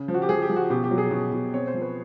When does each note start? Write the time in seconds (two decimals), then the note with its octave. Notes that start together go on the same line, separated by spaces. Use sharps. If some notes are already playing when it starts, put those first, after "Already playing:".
Already playing: C#3
0.08 F3
0.14 F#4
0.22 G4
0.29 F3 G#4
0.42 G4
0.50 F3
0.56 F#4
0.70 B2 G4
0.84 G4
0.91 F#3
0.98 G#4
1.11 B2
1.32 B2
1.53 C4 C#5
1.67 C5
1.74 F3
1.82 B4